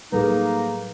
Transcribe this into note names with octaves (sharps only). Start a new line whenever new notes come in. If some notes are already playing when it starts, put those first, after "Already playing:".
A2 F#3 G3 A#3 D#4 G#4 A4 B4